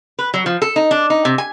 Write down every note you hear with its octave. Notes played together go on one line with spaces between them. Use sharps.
B4
F#3
F3
A4
D#4
D4
D#4
C3
G#5